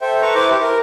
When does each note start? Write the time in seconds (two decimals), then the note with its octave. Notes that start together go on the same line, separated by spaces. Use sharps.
0.01 A4 C5 E5 G5
0.22 A4 B4 A#5 C#6
0.35 E4 B4 C5 D6
0.50 E4 G4
0.62 A#4